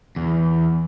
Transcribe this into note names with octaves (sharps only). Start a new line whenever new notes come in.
E2